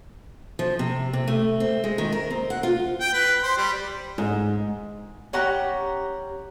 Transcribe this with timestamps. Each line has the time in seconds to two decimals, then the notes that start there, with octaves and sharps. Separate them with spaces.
0.59 F3
0.79 C3
1.13 C3
1.28 A3
1.60 C4
1.84 G#3
1.98 D#3
2.12 A#4
2.30 C4
2.50 F#5
2.63 F4
3.00 G5
3.13 B4
3.43 C5
3.57 G3
4.18 G#2
5.33 C#4 G4 F#5 A#5